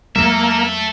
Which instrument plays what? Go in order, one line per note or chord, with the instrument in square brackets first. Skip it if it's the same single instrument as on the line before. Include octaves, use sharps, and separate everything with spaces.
[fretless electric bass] F2 F#3 G#3 [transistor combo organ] A#3 [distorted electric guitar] A4 E5